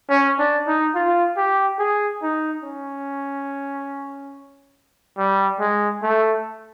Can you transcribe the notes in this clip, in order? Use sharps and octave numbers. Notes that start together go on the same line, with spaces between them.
C#4
D4
D#4
F4
G4
G#4
D#4
C#4
G3
G#3
A3